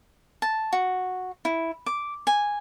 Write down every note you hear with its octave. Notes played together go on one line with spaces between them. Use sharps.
A5
F#4
E4
D6
G#5